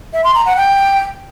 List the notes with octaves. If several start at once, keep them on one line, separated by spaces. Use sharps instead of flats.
E5
C6
A#5
F#5
G5